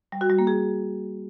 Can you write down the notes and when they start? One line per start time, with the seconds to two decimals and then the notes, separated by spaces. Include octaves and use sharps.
0.12 G3
0.21 F#4
0.30 G3
0.39 A#3
0.47 G#4